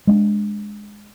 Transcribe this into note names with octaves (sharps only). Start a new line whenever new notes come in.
G#3 B3 D4